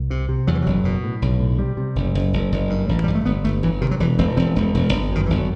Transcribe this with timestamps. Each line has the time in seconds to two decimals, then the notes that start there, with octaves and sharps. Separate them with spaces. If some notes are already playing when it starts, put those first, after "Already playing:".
Already playing: C2
0.10 C3
0.29 C3
0.47 E2 F#3
0.55 E3
0.62 F#1 F#3
0.85 B2
1.03 A2
1.22 B1
1.40 A2
1.58 C3 G3
1.77 C3
1.96 F#1
2.15 F#1
2.33 F#1
2.52 F#1
2.70 G2
2.89 A1
3.04 G2 G3
3.15 A3
3.25 G1 B3
3.44 G1 A3
3.63 G1 E3
3.81 C3 D#3
3.91 F#3
4.00 E1 E3
4.18 E1 C4
4.37 E1 C4
4.56 E1
4.74 E1
4.93 G1
5.11 F#2 D#3
5.26 G1 E3
5.38 F#3